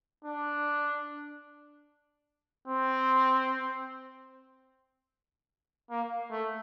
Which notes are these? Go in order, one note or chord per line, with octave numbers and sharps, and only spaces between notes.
D4
C4
A#3
A3